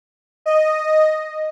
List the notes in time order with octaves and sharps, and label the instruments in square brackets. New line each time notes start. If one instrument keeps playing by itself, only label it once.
[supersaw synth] D#5